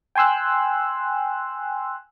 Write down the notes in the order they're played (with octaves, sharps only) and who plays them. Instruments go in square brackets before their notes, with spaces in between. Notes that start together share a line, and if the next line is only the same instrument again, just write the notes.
[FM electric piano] G5 G#5 C6 E6 F#6